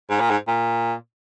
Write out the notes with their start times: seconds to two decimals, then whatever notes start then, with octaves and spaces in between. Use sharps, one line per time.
0.10 G#2
0.20 A#2
0.30 G#2
0.48 A#2